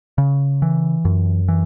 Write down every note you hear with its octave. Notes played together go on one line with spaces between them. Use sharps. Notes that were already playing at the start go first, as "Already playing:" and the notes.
C#3
E3
F#2
E3